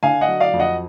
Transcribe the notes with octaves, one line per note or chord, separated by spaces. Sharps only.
D3 F5 G#5
D#5 F#5
F#3
D5 F5
F2
D#5 F#5